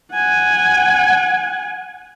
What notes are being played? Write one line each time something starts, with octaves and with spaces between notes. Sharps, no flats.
F#5 G#5